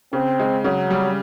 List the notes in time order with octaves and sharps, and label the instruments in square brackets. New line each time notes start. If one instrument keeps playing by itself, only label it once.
[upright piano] C#3 [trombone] C4
[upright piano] G#3
[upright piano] C#3 [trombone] F#3
[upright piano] G3